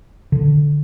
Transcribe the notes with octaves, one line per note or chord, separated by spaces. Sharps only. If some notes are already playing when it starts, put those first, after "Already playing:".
D3